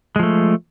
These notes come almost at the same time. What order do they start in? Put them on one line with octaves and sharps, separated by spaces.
G#3 F3 A3